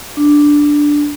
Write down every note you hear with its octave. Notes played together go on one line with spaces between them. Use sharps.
D4